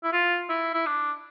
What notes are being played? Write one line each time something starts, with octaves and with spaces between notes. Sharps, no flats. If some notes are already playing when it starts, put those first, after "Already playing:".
E4
F4
E4
E4
D4